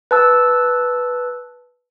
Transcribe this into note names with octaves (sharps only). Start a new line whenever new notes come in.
B4 A5 E6